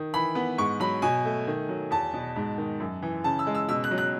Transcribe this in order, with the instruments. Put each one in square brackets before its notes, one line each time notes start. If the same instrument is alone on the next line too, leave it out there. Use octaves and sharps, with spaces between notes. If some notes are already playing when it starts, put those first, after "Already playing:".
Already playing: [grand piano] D#3
E3 B5
B3
G#2 C#6
F#3 B5
B2 G#5
A3
D#3
F#3
E2 A5
B2
G#2
D#3
F#2
E3
C#3 A5
E6
G#3
E6
B2 E6
F#6
F#3
F#6